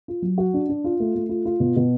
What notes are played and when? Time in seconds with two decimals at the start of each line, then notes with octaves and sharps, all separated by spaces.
0.08 F4
0.22 F#3
0.38 F#4
0.54 D4
0.69 D4
0.84 F4
1.00 A3
1.15 A3
1.29 F4
1.45 F4
1.60 B2
1.76 B2